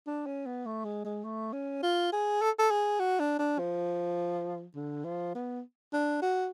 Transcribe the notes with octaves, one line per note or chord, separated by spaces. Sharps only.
D4
C#4
B3
A3
G#3
G#3
A3
C#4
F4
G#4
A4
A4
G#4
F#4
D4
D4
F3
D3
F3
B3
D4
F#4